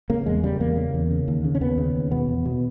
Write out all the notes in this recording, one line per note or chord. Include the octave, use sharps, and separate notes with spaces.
C#3 A#3
E2 G#3
C#3 G3
E2 A#3
C#3
E2
C#3
D#2
C#3
C#4
D#2 B3
C#3
D#2
B2 B3
E2
B2